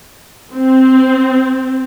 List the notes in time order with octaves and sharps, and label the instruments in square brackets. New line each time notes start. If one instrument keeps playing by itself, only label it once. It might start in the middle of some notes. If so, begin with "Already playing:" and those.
[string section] C4